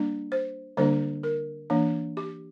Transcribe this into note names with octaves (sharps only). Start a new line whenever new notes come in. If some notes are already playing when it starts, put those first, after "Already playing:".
Already playing: G3 A#3 D4
C5
D3 G3 A#3 D4 C5
A#4
E3 A#3 D4
G4